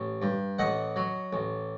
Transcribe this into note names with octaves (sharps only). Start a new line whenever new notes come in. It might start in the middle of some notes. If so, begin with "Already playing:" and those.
Already playing: A1
G2
A1 D#5 F#5
F#3
A1